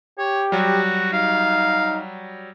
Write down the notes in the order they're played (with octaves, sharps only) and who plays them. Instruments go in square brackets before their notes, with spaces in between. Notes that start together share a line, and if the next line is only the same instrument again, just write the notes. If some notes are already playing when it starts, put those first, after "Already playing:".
[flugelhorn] G4 [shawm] C#5
[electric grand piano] F#3 G3 [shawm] F#4
[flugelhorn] D#4 [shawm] F5